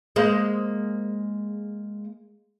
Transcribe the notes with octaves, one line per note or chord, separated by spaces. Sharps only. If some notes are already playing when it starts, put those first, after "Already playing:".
G#3 A#3 C5